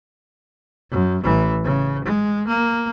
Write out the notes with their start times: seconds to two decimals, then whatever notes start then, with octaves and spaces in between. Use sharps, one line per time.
0.91 F#2
1.23 A1 E3
1.64 C#3
2.05 G#3
2.47 A#3